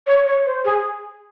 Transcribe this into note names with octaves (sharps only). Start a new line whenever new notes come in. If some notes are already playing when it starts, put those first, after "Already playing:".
C#5
C#5
C5
G#4